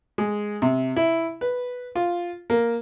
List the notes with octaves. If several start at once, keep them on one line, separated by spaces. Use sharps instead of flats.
G#3
C3
E4
B4
F4
A#3